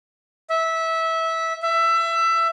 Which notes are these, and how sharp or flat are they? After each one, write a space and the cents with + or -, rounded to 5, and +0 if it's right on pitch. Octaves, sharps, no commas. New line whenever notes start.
E5 -15
E5 +20